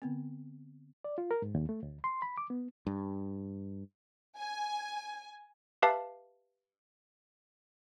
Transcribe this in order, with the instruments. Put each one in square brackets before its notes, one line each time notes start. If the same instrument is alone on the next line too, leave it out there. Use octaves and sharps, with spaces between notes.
[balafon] D3 B3 C4
[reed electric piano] D5
F4
A#4
G#2
D#2
A3
D2
C6
B5
D6
B3
[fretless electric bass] G2
[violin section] G#5
[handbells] G4 B4 E5 F5 A5